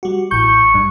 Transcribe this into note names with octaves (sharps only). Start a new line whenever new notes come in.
G3 F#4
A1 C#6 G6
G2